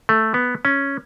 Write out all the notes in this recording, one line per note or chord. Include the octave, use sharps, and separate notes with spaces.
A3
B3
C#4